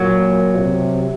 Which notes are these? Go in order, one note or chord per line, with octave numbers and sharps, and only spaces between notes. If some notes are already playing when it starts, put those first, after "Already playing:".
Already playing: A#2 F#3
C3